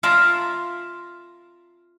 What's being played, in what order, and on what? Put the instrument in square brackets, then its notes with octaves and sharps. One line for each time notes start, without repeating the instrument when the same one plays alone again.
[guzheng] F4 A#4 E5 F5 A5 A#5